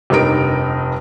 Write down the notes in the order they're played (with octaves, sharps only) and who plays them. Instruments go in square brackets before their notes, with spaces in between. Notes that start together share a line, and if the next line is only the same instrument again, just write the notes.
[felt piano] F1 G2 D#4 A#4 D7